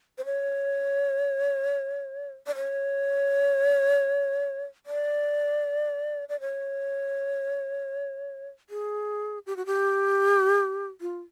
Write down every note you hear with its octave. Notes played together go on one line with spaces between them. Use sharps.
C5
C#5
D5
C#5
D5
D5
C#5
G#4
G4
F#4
G4
F4